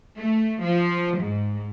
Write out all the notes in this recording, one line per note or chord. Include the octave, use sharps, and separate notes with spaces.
A3
F3
G#2